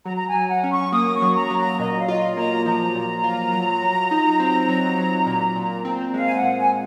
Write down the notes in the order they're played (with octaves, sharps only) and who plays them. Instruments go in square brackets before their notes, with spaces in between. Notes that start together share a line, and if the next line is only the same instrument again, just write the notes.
[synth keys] F#3 [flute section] A#5
[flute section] A#5
G#5
[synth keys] F#3
[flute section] F#5
[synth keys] C#4
[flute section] C#6
[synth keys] A#3 [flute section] D#6
[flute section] C#6
[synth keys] F#3
[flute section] A#5
[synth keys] F#3
[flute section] A#5
[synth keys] A#2 [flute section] D#5
[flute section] F5
[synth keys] F4 [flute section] D#5
[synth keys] A#3 [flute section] A#5
[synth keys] F3 [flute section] A#5
[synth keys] A#2
F4
F#3
F#3
D#4
C4
F#3
F#3
A#2
A#2
C4
[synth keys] G#3 [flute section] F5
[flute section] G#5
F#5
[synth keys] A#2
[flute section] G#5